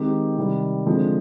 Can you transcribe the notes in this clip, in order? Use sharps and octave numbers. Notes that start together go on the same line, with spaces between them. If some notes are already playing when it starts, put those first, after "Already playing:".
Already playing: D#3 G#3 C4 D#4 G4
C3 D#3 G3
D3 F3 G#3 C4